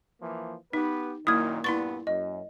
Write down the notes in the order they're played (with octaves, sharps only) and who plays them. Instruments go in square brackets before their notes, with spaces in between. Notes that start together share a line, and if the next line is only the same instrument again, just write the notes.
[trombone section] E3 F3 A#3
[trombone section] B3 G4 B4 [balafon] D#4
[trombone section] F#2 A#2 D#3 [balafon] A#3 E4 [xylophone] D#6 G#6
[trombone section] G2 A#2 B3 [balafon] E4 C6 C#6 [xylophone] A6
[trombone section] F#2 [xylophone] D#5